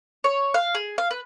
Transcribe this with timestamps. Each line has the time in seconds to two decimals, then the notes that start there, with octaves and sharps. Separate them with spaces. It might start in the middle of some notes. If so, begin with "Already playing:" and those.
0.24 C#5
0.54 F5
0.75 G#4
0.98 F5
1.11 B4